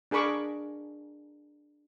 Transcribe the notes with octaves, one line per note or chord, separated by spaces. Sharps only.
D4 G#4 A#4 B5 C#6 D6